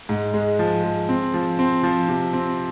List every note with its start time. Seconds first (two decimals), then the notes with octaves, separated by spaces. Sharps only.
0.09 G#2
0.34 G#3
0.59 F3
0.83 G#3
1.09 C4
1.34 F3
1.59 C4
1.83 F3
2.08 C3
2.33 C4